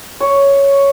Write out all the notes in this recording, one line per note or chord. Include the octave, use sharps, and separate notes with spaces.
C#5